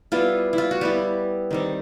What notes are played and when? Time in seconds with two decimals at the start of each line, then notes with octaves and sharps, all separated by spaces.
0.12 G3 B3 E4 F4
0.53 E4
0.58 F4
0.71 F#4
0.81 G3 B3 E4 G4
1.51 D#3 G3 C4